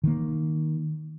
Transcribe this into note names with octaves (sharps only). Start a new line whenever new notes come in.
D#3 A#3